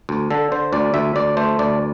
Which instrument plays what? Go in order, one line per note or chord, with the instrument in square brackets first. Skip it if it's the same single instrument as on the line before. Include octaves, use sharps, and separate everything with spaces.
[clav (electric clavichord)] D2
D3 A4
D3 C5
D2 D5
D2 E5
D2 D5
A3 C5
D2 D5